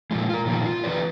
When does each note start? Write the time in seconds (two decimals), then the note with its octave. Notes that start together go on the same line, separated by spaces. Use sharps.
0.11 A#2 C#3 F3 G#3
0.29 F4 A#4
0.45 A#2 D#3 F3 B3
0.65 F4
0.84 D3 E3 G3 B4 D5